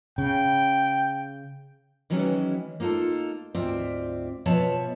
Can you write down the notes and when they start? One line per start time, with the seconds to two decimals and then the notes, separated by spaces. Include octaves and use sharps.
0.18 C#3 G5
2.10 D#3 E3 F#3 G#3 C#4 E4
2.80 A#3 D#4 F4 G#4 A4
3.55 D2 G#2 C4 F4 D5 E5
4.46 B2 F3 B3 C#5 E5 A5